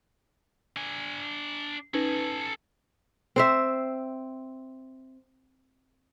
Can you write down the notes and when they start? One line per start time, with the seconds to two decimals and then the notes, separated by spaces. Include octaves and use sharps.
0.76 D4 G#5
1.94 C#4 D#4 A4 B4 G#5
3.36 C4 C5 E5